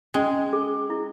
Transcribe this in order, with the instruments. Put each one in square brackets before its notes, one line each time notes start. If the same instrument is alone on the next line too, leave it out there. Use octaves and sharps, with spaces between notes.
[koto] G#3 [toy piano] C#4
[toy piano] G#4
E4